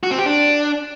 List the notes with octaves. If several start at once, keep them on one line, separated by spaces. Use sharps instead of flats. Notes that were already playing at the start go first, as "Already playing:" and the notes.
F#4
C4
G4
D4